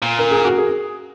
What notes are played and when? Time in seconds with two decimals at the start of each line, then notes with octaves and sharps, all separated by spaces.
0.03 A#2
0.19 A#4
0.31 G#4
0.45 F#4
0.58 G#4